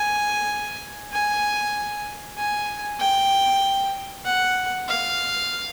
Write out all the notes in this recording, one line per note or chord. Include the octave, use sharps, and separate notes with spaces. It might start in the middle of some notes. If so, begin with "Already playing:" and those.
Already playing: G#5
G#5
G#5
G5
F#5
F5